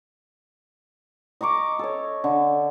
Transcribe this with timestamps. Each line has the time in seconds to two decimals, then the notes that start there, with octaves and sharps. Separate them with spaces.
1.41 D#5 A#5 C#6 D6
1.79 A4 C#5
2.24 D3